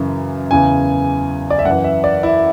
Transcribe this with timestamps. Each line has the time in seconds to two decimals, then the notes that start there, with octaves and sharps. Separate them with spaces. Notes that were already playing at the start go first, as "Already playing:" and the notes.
Already playing: F#2 C#3 E3
0.51 E2 C#3 E3 G#5
1.50 D5
1.59 E5
1.65 F#2 E3 F#5
1.84 E5
2.04 D5
2.23 E4